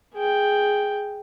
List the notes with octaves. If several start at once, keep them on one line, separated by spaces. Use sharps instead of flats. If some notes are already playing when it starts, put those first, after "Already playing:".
G#4 G5